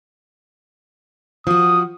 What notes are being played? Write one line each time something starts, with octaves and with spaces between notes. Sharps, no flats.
F3 F#4 D#6